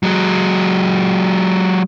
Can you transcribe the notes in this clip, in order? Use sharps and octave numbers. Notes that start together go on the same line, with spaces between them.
F#3 G#3